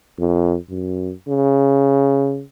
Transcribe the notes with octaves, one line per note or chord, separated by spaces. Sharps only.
F2
F#2
C#3